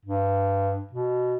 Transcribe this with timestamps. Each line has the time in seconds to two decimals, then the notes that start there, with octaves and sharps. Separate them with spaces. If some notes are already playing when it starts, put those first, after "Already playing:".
0.05 G2
0.93 B2